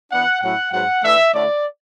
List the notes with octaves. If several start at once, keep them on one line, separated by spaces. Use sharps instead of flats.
E3 B3 D4 F#5
A2 F#3 C#4 E4 F#5
G#2 F#3 B3 F#5
E3 A3 D4 E5
D3 A3 C#4 E4 D5